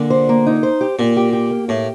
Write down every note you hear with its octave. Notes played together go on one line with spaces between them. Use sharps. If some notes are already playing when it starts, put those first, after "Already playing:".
Already playing: A#2 D3
C5
A#3
D#4
C5
G4
A#2 G4
G4
G4
A#3
A2 G4